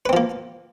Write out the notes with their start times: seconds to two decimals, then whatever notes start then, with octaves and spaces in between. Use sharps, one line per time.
0.06 B4
0.09 C4
0.13 F3
0.17 A#3